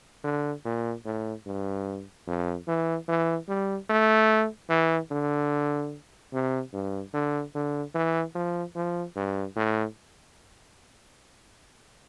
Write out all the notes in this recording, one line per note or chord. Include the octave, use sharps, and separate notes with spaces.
D3
A#2
A2
G2
F2
E3
E3
G3
A3
E3
D3
C3
G2
D3
D3
E3
F3
F3
G2
A2